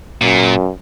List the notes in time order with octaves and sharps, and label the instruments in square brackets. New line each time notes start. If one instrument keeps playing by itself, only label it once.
[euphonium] F#2 [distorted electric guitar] A#2